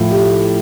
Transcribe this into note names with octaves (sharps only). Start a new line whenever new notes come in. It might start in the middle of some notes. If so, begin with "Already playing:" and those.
Already playing: A2 F3
G4